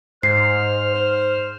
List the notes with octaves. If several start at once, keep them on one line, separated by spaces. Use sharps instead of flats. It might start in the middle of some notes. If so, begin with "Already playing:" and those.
G#2 C5 F6 C7
C5